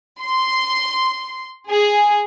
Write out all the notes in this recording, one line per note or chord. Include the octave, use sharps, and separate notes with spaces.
C6
G#4